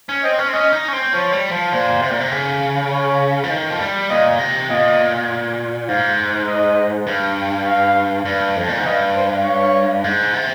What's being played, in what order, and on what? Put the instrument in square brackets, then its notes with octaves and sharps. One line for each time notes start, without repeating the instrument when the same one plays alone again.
[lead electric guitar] C#4
[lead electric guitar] C4 [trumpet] D#5
[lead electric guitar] C#4
C4
[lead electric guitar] C#4 [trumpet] D#5
[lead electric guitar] D#4
C#4
C4
[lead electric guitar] F3 [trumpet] C#5
[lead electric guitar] G3
F3
[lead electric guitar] A#2 [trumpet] C5
[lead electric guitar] C3
A#2
C3
C#3
[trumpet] C#5
[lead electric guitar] F3
D#3
F3
G3
[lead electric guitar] A#2 [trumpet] D#5
[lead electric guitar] C3
[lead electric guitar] A#2 [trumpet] D#5
[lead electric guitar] G#2 [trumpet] F5
[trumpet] D#5
[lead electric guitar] G2
[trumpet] F5
[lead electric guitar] G2
F2
A#2
G#2
[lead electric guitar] G2 [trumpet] D#5
[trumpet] C5
C#5
[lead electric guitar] G#2
C3